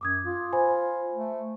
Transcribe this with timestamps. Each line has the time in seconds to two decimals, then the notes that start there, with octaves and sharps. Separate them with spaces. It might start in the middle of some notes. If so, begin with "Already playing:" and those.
0.01 F#2 D6 D#6 G#6
0.24 F4
0.53 C5 G#5 B5
1.13 A3